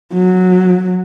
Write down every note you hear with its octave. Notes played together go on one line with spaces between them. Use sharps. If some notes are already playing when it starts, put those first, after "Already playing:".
F#3